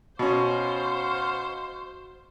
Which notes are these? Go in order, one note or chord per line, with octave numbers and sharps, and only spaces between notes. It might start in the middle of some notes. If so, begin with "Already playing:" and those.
B2 C#4 F#4 C5 F5 F#5 C#6